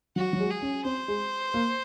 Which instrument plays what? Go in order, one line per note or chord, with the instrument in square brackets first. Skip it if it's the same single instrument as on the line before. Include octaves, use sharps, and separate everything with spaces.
[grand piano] F#3 [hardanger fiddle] F#4
[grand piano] F#3
G#3
[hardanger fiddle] G#4
[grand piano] C#4
[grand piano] C4 [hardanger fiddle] C5
[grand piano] G#3
A#3